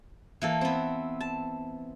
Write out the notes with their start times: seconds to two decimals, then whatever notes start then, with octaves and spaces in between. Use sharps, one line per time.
0.41 E3 A#3 A4
0.61 B3 C4
1.20 A5